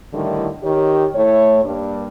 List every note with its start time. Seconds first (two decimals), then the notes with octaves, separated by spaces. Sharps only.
0.13 A2 D3 D#3 G3 D#4 E4
0.63 D#3 G4 C#5
1.15 A2 A3 E4 C#5
1.65 G2 A#3 D4